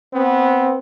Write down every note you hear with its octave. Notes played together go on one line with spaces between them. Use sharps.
B3 C4